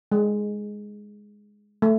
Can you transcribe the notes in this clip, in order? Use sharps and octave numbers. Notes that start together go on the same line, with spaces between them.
G#3
A3